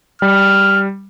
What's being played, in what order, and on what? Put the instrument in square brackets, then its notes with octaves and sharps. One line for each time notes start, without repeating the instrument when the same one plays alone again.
[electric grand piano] G3 [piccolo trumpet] F6